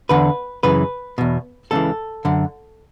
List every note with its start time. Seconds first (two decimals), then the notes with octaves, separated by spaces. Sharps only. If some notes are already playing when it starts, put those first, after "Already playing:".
0.09 E2 D3 B4
0.63 F#2 C#3 E3 B4
1.18 E2 B2
1.71 C#2 C#3 E3 A4
2.25 F#2 D3